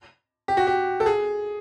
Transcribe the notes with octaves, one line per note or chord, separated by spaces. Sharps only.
G4
F#4
G4
A4
G#4